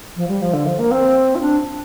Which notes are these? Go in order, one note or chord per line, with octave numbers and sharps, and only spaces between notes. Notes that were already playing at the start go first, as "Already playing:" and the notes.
F3
G3
F3
D3
F3
A#3
C4
F4
D4